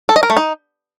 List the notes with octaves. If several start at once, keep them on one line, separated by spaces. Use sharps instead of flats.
A4
D#5
A#4
A3
D#4